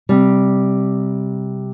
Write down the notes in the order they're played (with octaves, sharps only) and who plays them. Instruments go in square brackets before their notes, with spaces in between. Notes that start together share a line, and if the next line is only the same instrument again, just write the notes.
[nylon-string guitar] C3 G3